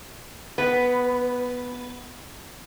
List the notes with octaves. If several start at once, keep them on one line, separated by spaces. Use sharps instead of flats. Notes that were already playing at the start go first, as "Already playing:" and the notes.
B3 B4